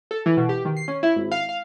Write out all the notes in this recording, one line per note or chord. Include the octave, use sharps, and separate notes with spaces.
A4
E3
B2
G4
D#3
C7
C#4
E4
G#1
F5
F5